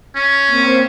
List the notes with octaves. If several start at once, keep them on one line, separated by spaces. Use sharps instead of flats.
C#4
A#3 C4 C5